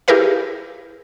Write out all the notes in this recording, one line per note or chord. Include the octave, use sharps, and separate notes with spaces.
E4 G4 G#4 A#4 B4 F5